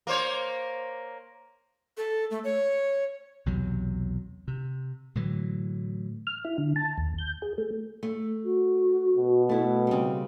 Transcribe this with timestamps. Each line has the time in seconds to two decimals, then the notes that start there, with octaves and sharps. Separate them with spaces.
0.07 A#3 C5 C#5
1.97 A4
2.31 A3
2.44 C#5
3.46 B1 E2 C3 F#3
4.48 C3
5.15 A2 D3 E3 F#3
6.27 F6
6.45 E4
6.58 D3
6.76 A5
6.98 D#2
7.18 G6
7.42 G#4
7.58 A3
8.03 A3
8.44 F#4
9.17 B2
9.49 A3 E4 B4
9.87 C#3 G3 C4